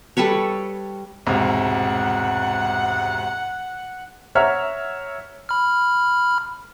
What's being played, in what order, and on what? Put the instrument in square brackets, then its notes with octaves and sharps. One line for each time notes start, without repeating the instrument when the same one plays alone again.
[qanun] G3 A4 B4 C#5
[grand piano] E1 C2 G#2 [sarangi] F#5
[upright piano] C#5 E5 F#5 A#5 F6
[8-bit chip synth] B5 F6